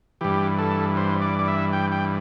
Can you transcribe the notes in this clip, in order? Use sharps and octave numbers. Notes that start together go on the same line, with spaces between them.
G2 E3 G4
A4
C5
D5
D5
E5
G5
G5